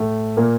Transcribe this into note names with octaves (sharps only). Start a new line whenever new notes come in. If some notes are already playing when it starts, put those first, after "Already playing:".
Already playing: A2 A3
A#2 A#3